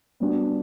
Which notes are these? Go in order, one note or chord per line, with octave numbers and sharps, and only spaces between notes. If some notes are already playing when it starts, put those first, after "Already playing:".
G3 B3 D4 F#4